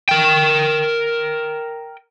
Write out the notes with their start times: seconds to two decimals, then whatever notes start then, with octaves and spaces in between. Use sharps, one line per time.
0.09 A#4 G5